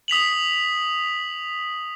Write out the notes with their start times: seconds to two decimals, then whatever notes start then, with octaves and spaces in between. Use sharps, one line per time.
0.08 D#6 B6 F7 F#7